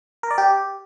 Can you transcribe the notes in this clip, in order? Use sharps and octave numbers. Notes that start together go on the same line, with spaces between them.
A#4
D5
G4